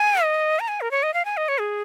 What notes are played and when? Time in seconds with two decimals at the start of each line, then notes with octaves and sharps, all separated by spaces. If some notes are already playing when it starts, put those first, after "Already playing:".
Already playing: G#5
0.23 D#5
0.60 A#5
0.68 G#5
0.81 A#4
0.91 C#5
1.03 D#5
1.14 F5
1.25 G#5
1.37 D#5
1.48 C#5
1.60 G#4